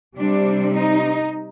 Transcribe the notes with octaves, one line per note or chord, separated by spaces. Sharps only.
C3 G3 C4 D4
D#4